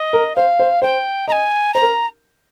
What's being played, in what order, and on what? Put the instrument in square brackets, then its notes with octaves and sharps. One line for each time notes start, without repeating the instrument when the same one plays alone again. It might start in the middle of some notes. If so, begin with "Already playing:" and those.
Already playing: [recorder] D#5
[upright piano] A#4
[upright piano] C5 [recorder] F5
[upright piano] C5
[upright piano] C5 [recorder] G5
[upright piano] D#5 [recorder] A#5
[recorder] G#5
[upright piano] C5 [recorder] A#5
[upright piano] A#4